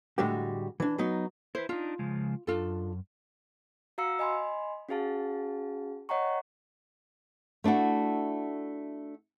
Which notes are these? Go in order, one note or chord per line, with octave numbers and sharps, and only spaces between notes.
A2 D3 G3 G#3 F#4 G4
E3 D4
F#3 B3 D#4
E4 B4 C5
D4 D#4 F4
C#3 F3 G#3
F#2 D4 F4 A4
F#4 F5 A#5 E6 C#7
D#5 G#5 B5 C6
C#4 F#4 G#4 F5 A5
C#5 D#5 F#5 G5 A#5 C#6
A3 D4 E4 F#4